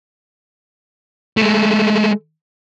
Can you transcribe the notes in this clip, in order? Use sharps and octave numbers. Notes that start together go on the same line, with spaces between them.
G#3 A3